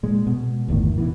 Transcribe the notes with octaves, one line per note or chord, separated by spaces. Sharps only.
A#2 G#3
B2
G1 E2 A2 D#3
B2 E3